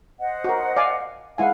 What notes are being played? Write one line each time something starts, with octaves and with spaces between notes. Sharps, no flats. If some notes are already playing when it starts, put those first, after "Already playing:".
C5 D#5 F#5
F#4 A#4
D5 F5 G#5
G#3 E4 F5 F#5 G#5